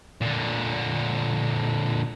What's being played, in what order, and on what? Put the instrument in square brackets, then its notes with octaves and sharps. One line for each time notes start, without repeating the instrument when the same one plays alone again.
[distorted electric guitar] A#2 D3